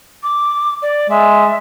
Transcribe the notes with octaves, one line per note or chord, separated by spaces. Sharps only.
D6
D5
G#3 E5